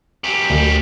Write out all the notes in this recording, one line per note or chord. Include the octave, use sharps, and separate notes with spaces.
F#2 G3
D2